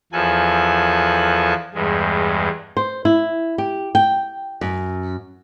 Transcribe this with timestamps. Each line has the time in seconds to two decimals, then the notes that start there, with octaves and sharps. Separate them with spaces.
0.13 E2 F3 A4 G#5 F#6
1.74 E2 G2 G#3
2.77 C5
3.05 E4
3.58 G4
3.95 G5
4.61 F#2